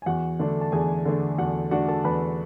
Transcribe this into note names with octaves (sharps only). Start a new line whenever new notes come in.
G#5
E2 F#4 F#5
D3 A3 D4
A5
E2 G#4 G#5
D3 A3 D4
E2 F#4 F#5
D3 A3 D4 F#4 F#5
A4 A5
E2 B4 B5